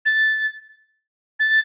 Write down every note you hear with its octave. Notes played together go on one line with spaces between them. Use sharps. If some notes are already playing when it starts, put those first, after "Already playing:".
A6
A6